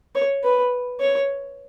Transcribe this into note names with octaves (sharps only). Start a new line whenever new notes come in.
C#5
B4
C#5